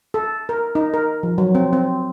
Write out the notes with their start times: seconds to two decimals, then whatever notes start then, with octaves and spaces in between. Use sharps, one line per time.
0.14 A4
0.49 A#4
0.75 D#4
0.94 A#4
1.23 F3
1.38 F#3
1.55 C4
1.73 C4